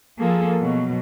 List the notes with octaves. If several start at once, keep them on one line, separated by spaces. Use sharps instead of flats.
F3 A#3 G#4 A4
B2 F#3